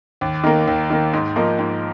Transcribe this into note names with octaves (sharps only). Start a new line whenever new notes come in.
D#2
D#3 A#3
D#2
D#3 A#3
G#2
F3 A#3 D#4
G#2